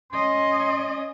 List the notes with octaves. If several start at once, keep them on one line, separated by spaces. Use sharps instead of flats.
C#4 D#5 C6